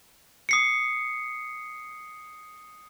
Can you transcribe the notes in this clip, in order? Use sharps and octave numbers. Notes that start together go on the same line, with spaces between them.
D#6 C7 C#7